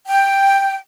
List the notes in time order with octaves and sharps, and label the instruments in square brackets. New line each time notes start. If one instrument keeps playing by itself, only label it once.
[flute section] G5